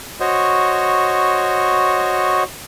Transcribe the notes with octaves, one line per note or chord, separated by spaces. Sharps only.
F#4 C5 C#5 D#5